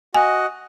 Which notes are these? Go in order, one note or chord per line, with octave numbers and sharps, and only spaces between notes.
F#4 D#5 F#5 G#5